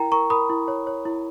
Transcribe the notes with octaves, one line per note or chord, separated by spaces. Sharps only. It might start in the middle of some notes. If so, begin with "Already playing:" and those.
Already playing: E4 A#4 G5 A#5
A#4 A#5 C#6
A#4 B5 D#6
E4
C#5
C#5
E4